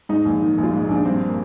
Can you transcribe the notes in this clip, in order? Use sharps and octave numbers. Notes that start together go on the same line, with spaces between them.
G#2 D#4
A#1
D#3
A#1
F4
G#2 D#4
A#1 D4
G2 C4
A#3